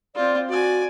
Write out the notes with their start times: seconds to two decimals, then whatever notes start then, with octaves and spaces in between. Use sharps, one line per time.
0.15 C4 F4 D5
0.49 F#4 D5 G#5